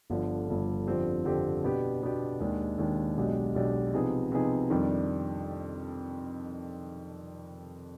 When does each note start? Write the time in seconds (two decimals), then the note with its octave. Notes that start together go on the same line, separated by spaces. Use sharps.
0.10 G1 G2 D3 F3
0.48 G1 G2 D3 F3
0.87 F2 D3 F3 C4 G4
1.25 F2 D3 F3 C4 G4
1.64 B2 B3 D4 G4
2.02 B2 B3 D4 G4
2.40 D#2 D#3 G#3 D4
2.78 D#2 D#3 G#3 D4
3.17 B1 B2 G#3 D4 G4
3.55 B1 B2 G#3 D4 G4
3.94 C3 F3 B3 D#4 G#4
4.32 C3 F3 B3 D#4 G#4
4.70 F2 D#3 G3 D4